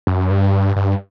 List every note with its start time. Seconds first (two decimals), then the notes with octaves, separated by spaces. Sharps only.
0.07 F#2
0.31 G2
0.76 G2